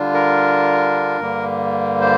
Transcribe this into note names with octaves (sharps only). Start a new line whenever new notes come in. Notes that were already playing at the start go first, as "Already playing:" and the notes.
Already playing: D3 G3 D4 F4
A#4
G2 D3 G3 A#3
C5